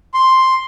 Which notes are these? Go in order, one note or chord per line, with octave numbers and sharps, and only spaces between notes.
C6